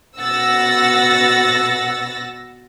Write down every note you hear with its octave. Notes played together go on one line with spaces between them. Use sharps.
B2 F#5 E6 A6 A#6